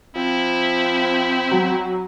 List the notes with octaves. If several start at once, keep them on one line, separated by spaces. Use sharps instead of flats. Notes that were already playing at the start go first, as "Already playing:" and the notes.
F3 C4 E4
F#3